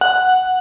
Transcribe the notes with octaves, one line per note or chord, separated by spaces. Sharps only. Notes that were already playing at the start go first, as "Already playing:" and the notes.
F#5